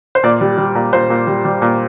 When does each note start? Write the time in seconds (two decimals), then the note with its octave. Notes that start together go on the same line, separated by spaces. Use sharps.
0.15 C5
0.23 A#2 D5
0.41 G3
0.58 G3
0.75 A#2
0.93 A#2 C5
1.10 A#2
1.27 G3
1.45 G3
1.62 A#2